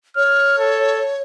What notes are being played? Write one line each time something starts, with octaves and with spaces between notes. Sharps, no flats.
C#5 F6
A4